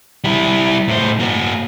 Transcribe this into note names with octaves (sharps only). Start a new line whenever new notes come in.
G3 E4
A2 C5
A#3 F#4